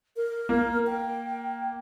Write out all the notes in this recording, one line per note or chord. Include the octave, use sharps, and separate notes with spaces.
A#4
A#3
G5